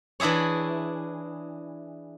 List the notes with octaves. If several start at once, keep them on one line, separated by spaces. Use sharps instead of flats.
E3 D4 E4 G#4 C#5